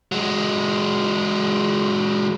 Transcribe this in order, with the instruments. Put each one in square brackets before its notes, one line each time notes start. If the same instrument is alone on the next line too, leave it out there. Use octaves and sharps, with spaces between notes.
[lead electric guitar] F#3 G#3